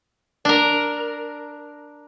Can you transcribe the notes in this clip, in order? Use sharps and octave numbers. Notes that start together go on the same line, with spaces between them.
D4 A#4